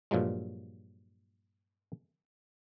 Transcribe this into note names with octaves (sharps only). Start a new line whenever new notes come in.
G2 A#2 F3 F#3 G#3